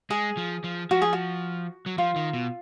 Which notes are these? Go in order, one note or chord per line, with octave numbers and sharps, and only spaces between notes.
G#3 G#4
F3
F3
F3 F#4
G#4
F#4
F#3
F3 F4
D#3
B2